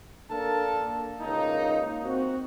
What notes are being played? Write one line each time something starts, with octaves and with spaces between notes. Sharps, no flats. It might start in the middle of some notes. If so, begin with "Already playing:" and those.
A#3 D4 A4 A#4 A5
C#2 A#3 D#4
C4 F#4